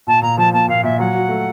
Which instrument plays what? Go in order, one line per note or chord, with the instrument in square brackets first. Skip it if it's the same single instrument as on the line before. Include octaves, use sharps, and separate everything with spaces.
[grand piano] A#2 [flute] A5
[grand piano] A#2 [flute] A#5
[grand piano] F3 [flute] A5
[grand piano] A#3 [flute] A5
[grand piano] A#2 [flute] F5
[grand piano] A#2 [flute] E5
[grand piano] F#3 [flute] F#5
[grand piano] F#4
A3